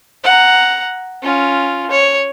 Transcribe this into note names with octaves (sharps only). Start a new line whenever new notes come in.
F#5 A#5
C#4 F4
C#5